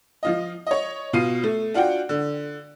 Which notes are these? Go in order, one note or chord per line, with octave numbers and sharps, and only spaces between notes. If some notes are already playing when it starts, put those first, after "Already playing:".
F3 F4 D#5
C#5 D#5
B2 F4 C7 D#7
A3
D4 F4 F#4 F#5 G5
D3